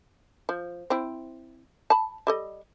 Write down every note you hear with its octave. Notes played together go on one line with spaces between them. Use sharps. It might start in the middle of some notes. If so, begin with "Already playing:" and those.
F3
C4 E4
A5 B5
G3 A4 D#5